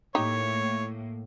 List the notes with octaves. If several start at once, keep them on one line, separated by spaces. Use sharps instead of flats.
A2 A#3 D#4 G4 C#5